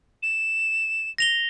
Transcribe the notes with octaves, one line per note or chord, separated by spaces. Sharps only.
E7
A#6 F7 G7